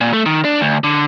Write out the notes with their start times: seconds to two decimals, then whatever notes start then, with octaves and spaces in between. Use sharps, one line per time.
0.01 A#2
0.13 A3
0.26 D#3
0.45 D4
0.61 D2
0.84 D3